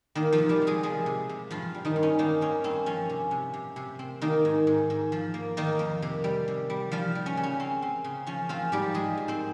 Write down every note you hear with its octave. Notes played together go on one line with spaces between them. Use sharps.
D#3 A#3 D#4
F3 F4
C3
G3 G4
C3
G#3 G#4
F3 G#3 G#4
C3
C3
G2 F3 F4
G3
D#3 D#4
G2
C#4
D#3 A#3 D#4
A#3 C#4
G2 C4
F3 C#4
C3
C3
C3
C3
C4
D#3 A#3 D#4
G#2
G#2
G#2
F3
A#3
D#3 A#3 D#4
F2
C3
G3
C3
G3
F3 G3 F4
G3
C#4
C#3
C#4
C4
C4
C#3
F3 C#4
F3 C4 F4
G#2 G3 G4
F3 G#3 G#4
G#2
C4 C5